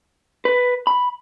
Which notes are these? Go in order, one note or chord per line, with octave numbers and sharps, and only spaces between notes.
B4
B5